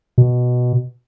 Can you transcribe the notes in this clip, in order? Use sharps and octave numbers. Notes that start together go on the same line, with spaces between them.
B2